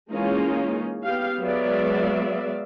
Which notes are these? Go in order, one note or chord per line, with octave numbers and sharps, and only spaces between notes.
E3 G#3 A#3 C#4 D#4 F4
B3 G4 F5
F#3 G#3 B3 D5 E5 F5